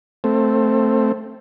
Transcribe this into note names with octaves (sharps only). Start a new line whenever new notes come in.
A3 C4